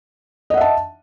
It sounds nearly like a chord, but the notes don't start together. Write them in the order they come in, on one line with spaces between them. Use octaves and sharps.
D#5 F#5 E5 A5